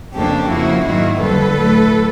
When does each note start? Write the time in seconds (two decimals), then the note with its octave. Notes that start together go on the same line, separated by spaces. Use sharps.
0.13 F2 C#3 F3 A#3 D4 G4 A4
0.49 F2 C#3 F3 A#3 E4 F#4
0.84 G#2 D#3 F#3 A#3 E4 F#4
1.20 F2 D3 G3 A4 B4
1.56 A2 F#3 A3